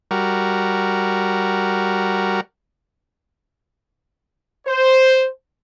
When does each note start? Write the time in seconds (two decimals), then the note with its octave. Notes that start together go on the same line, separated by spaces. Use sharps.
0.11 G3 F#4 A#4
4.66 C5